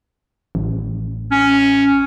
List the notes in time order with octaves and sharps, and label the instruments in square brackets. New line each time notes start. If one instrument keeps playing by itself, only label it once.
[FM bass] A1
[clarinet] C#4